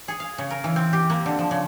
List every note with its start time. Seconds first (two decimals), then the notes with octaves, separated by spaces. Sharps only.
0.08 G#4
0.20 F5
0.38 C#3
0.50 A#4
0.64 E3
0.76 C4
0.93 G4
1.10 A#3
1.26 D3
1.39 F3
1.51 C#3